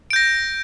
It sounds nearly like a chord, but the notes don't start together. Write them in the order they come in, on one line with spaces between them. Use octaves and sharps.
D7 G6 A#6